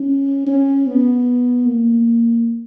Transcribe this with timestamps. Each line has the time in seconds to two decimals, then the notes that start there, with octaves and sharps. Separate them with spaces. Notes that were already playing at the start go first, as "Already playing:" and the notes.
Already playing: C#4
0.47 C#4
0.87 B3
1.66 A#3